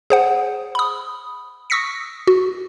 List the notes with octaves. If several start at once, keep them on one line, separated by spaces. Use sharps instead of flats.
G#4 C5 F#5
B5 D#6
C#6 D#6 E6 A#6 B6 C#7
F#4